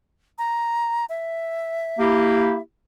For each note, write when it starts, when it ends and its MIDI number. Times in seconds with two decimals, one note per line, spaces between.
0.38 1.05 82
1.09 2.62 76
1.99 2.58 58
1.99 2.58 64
1.99 2.58 67